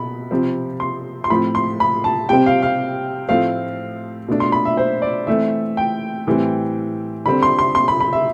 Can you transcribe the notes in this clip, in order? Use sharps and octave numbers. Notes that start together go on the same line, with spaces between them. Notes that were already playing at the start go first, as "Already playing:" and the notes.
Already playing: B2 B5
C3 F3 C4
C6
C6
A2 F3 C4 B5
C6
B5
A5
C3 G3 C4 G5
F5
F5
A2 F3 A3 C4 F5
B2 A3 D4
C6
B5
E5
C5
D5
E3 A3 C4 E5
G5
A2 E3 G3 C4
D3 G3 C4 B5
C6
C6
C6
B5
B5
E5